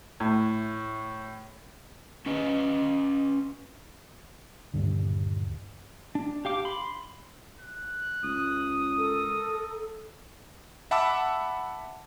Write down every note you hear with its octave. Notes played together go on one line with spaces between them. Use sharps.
A2
C#4 B4 D#5
D#1 B1 G2 D3
D4
G4 F5 D6
B5 C6
F#6
C#2 D#6
A4 A#4
E5 F#5 A5 B5 D6 E6